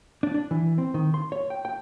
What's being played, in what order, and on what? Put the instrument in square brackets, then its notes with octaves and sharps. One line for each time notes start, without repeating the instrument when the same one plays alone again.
[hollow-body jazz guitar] D4
D4
E3
C4
D#3
C6
C#5
G5
G5